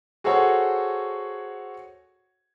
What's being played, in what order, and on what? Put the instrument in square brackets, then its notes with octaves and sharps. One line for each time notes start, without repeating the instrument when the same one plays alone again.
[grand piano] F#4 G#4 A4 C5 C#5 F#5